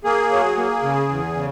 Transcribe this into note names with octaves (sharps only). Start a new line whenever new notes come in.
A#3 G#4
F#3
A#3
C#3
E2
C#3